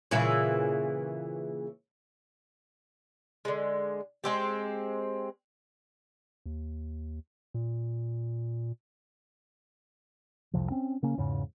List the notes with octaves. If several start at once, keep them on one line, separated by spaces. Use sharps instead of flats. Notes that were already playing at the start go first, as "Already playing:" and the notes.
A#2 C#3 E3
D3 G#3
G#3 C4 G4
D#2
A#2
C2 F2 C3 F3
C4 C#4
C#3 A#3 C#4
E2 G#2 C#3